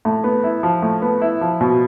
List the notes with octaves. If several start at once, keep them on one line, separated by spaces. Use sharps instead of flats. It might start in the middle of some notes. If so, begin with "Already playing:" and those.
A2
B3
E4
F3
A2
B3
E4
F3
B2